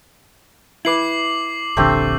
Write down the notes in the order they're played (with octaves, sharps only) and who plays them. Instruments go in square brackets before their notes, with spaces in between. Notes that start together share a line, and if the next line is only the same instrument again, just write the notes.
[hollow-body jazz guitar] E4 B4 [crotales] D6 C7 F#7
[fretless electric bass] D#1 A#1 D3 [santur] A3 C4 G4